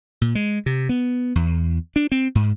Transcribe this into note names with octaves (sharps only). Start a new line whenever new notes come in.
A#2
G#3
C3
B3
E2
D4
C4
G#2